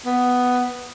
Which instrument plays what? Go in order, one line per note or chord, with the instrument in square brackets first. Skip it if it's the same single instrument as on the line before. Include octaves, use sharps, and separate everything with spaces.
[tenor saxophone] B3